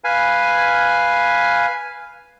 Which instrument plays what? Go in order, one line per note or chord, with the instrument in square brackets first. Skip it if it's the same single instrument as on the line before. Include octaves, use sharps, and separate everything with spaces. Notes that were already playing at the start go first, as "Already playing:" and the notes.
[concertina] B4 F5 G#5